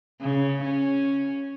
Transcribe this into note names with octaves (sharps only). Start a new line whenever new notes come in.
C#3
C#4